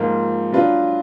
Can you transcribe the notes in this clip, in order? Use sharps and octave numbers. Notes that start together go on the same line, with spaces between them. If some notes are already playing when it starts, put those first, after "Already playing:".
Already playing: G#2 F3 A#3 F4
F#3 D4 F4 B4